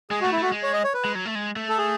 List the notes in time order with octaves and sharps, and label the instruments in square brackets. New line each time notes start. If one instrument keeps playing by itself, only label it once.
[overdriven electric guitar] G#3 [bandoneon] G#4
[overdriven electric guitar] A3 [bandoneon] F#4
[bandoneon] E4
[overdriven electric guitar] A3 [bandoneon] F#4
[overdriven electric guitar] G#3
[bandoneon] C#5
D#5
C#5
B4
[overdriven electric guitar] G#3
F#3
A3
G#3
A3
[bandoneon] A4
G#4